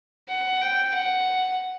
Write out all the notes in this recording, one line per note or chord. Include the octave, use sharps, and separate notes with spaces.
F#5
G5
F#5